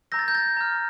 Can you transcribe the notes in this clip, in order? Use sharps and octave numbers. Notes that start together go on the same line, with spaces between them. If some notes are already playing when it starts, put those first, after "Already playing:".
A#5 E6 G6 A#6
A6
G6
A6
A#5 F6